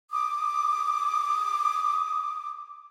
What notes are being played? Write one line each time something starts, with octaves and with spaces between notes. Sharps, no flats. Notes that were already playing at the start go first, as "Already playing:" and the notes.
D6 D#6